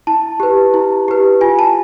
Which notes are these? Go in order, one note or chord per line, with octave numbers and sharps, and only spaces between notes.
E4 A5
G4 B4
E4
G4 B4
F4 G#5
A5